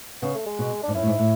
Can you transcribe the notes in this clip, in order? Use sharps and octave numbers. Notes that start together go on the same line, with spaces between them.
C#3 B3
A3
G#3
B2
G#2 D4
F#2 E4
A2
G#2
A2